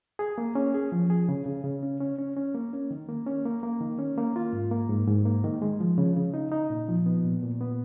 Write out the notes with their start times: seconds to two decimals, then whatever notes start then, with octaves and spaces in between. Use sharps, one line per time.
0.19 G#4
0.38 A#3
0.55 C#4
0.74 G#4
0.92 F3
1.10 G#4
1.29 C#3
1.46 C#3
1.64 C#3
1.83 C#4
2.00 C#4
2.19 C#4
2.36 C#4
2.54 A#3
2.73 C#4
2.91 D#3
3.09 A#3
3.26 C#4
3.45 A#3
3.63 A#3
3.81 D#3
3.99 C#4
4.18 A#3
4.36 F4
4.53 G#2
4.71 A#3
4.89 G#2
5.07 G#2
5.25 A#3
5.44 D#3
5.62 G#3
5.80 F3
5.98 C#3
6.16 C#3
6.34 D#4
6.52 D#4
6.70 A#2
6.88 F3
7.06 B3
7.24 A#2
7.43 A#2
7.61 B3